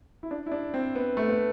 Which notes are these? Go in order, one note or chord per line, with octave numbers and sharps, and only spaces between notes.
E4
D4
E4
D4
C4
B3
A3
B3